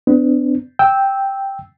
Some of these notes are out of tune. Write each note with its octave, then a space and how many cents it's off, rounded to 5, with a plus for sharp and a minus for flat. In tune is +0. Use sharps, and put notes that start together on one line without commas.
B3 +40 D4 +0
G5 +0 E6 -10